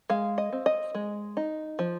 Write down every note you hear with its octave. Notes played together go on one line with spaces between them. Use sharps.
G#3 F5
D#5
C4
D#5
G#3
D#4
F3